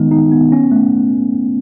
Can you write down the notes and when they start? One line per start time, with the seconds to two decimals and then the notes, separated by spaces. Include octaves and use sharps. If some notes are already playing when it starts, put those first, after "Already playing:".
Already playing: D#3 G#3 B3 D#4
0.11 D#4
0.32 B3
0.52 C#4
0.72 A3